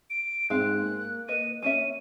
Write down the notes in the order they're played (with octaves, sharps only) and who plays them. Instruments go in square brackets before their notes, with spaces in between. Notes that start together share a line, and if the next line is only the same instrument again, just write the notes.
[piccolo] D7
[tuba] G#2 [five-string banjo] G#3 C4 F5 [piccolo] F#6
[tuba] A#3
[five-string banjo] A#4 B4 D#5 [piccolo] D#7
[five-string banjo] A#3 C#4 E5 [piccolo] D#7